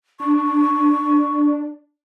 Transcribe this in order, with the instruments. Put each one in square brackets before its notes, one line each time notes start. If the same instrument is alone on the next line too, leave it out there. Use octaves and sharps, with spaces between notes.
[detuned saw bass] D4 [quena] C#6